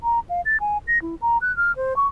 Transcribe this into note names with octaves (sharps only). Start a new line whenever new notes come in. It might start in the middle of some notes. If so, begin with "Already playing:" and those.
A#5
F5
A6
G#5
A#6
E4
A#5
F#6
F6
C5
C#6